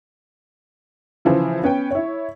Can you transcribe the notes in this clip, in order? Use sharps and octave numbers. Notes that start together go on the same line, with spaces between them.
C#3 E3 F3 C5
B3 C#4 B4 G5
E4 C#5